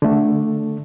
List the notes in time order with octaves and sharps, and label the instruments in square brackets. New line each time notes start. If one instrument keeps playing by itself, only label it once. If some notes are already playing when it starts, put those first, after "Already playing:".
[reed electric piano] D3 A3